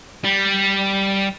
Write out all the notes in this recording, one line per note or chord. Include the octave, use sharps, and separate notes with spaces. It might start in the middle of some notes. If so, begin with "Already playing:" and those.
G3